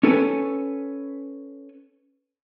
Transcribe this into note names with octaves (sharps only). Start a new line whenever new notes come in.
C#4 A4 B4 G#5